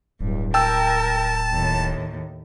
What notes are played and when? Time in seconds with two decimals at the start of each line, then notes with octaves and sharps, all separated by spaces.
0.21 D1 G2
0.54 A#4 G5 A5 E6
1.52 D#2 A2